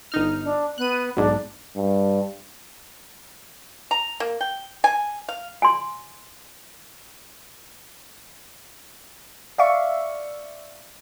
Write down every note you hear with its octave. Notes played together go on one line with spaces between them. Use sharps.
G1 D#4 F6
D4
B3 F#6 D#7
B1 G#2 D4
G2
A#5
A#3
G5
G#5
F5
G#5 C6
D5 E5 F5 C#6